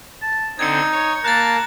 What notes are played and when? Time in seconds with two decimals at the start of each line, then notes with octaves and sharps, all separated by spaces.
0.22 A5
0.59 D3 C4 D#4 G#6 C#7
0.92 C#5
1.24 A#3 A5 A#5 F#6 A6